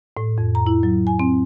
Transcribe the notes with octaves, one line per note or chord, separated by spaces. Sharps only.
A2
F2
A#5
E4
F#3
G#5
C4